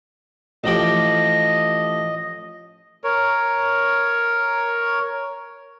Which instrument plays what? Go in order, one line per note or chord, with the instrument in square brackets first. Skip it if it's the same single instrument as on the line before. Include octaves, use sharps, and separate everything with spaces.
[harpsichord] A1 F3 G4 [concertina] D#5
[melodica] A#4 C#5